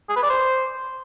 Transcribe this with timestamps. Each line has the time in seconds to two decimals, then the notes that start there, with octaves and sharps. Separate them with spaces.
0.09 G#4
0.16 B4
0.23 D5
0.30 C5